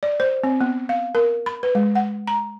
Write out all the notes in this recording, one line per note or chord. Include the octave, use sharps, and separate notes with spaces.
D5
C5
C4
B3
F5
A#4
B5
B4
G#3
F#5
A#5